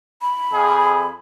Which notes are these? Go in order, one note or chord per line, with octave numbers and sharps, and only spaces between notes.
B5
F2 G#4